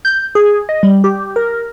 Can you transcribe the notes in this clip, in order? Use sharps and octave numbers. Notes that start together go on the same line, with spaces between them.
G6
G#4
D#5
G3
G4
A#4